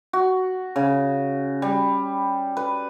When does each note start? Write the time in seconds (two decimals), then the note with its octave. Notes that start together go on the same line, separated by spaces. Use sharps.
0.13 F#4
0.76 C#3
1.62 G3
2.57 B4